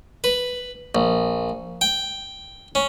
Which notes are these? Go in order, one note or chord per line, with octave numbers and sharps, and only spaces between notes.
B4
A#1
G5
C#4